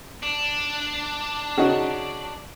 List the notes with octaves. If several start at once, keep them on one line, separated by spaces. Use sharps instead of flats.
D4
C#3 D#4 F#4